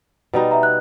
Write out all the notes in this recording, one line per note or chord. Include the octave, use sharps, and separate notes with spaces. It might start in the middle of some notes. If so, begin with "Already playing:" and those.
B2 G3 D#4
E5 A#5
F#6